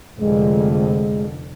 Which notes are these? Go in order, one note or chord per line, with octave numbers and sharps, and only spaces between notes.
F1 F2 D3 G#3
G#3